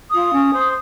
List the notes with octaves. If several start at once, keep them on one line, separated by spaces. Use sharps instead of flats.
F4 D#6
C#4
C5